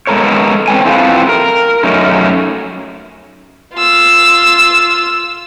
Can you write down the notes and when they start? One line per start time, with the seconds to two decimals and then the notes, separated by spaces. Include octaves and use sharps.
0.07 G#3 B3 A4 A#4 C#5
0.68 C4 B4 C#5 G5 G#5
0.85 C4 E4 F4 G4 A4 B4
1.29 A#4
1.83 F#2 A3 C#4 D#4
3.74 F4 E6